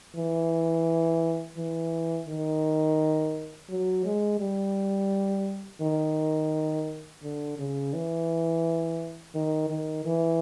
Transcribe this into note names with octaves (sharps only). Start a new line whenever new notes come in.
E3
E3
D#3
F#3
G#3
G3
D#3
D3
C#3
E3
D#3
D#3
E3